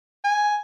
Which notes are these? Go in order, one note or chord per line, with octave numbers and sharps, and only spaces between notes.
G#5